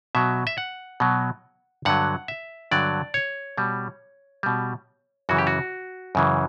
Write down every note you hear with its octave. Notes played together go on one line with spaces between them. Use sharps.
B2 F#3 E5
E5
F#5
B2 F#3
G2 D3 F#3 F#5
E5
G2 D3 F#3 D5
C#5
B2 G3
B2 G3
F#2 C#3 E3 F#4
G4
F#4
F#2 C#3 E3